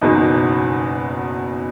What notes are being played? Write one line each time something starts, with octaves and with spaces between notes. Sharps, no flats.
F#1 E2 B2 D#4